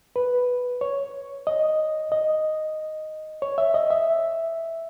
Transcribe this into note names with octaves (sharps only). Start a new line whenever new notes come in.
B4
C#5
D#5
D#5
C#5
E5
D#5
E5